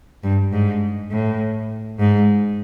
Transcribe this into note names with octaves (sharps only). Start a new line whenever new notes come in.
G2
G#2
A2
G#2